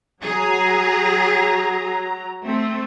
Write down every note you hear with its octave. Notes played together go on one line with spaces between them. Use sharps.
F#3 G#4 A#5
A3 C4